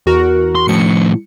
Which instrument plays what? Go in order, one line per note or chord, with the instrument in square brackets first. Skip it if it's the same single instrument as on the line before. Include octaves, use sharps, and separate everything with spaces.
[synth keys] E2 F#4 A#4
[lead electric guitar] C6
[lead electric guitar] A2 F3 [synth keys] C#7